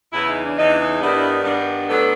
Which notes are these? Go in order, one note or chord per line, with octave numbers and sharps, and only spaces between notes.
E2 C#3 E3 E4
D#4
D4
E2 C#3 E3 D#4
D4
D#4
G2 D#3 G3 B3 D4 E4
G2 D#3 G3 B3 D4
A2 F#3 B3 D4 A4